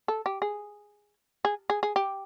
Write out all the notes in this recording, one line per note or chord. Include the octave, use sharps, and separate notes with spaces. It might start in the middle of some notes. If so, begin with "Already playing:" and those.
A4
G4
G#4
G#4
G#4
G#4
G4